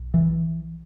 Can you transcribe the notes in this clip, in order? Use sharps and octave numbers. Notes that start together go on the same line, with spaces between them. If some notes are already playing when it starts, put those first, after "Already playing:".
Already playing: B1
E3